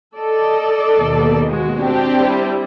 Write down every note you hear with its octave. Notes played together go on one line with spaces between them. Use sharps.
A4 D5 D#5
D#2 B2
G#3 F#4
C4 D4 G4
G3 E4